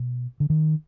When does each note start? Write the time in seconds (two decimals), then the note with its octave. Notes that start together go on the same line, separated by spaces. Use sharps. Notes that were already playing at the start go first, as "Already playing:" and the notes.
Already playing: B2
0.40 D3
0.50 D#3